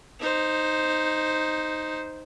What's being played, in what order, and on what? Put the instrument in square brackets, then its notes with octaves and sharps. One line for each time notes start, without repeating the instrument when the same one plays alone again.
[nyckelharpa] D#4 C5